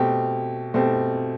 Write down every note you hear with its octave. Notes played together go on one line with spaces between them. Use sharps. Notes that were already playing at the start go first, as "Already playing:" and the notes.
Already playing: B2 A3 C4 G4
B2 A3 C4 G4